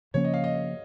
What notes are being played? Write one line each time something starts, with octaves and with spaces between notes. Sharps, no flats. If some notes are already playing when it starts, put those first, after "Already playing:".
C#3 F3 A#3 C#4 C#5
D#5
F5
D#5